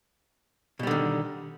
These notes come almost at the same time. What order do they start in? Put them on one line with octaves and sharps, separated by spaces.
B2 G3 D3 D#3